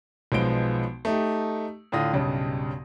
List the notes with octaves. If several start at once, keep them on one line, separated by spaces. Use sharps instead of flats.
B1 F3 G#3 B3 D7 G7
A3 D#4 G4
A2 D3 F4 D#6 A#6
B1 G2 C#3